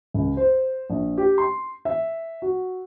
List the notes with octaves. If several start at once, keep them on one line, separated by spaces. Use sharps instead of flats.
C#2
C5
A#1
G4
C6
E5
F#4